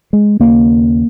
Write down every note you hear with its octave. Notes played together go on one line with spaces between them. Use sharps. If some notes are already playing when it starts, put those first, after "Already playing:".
G#3
D#2 C#3 A#3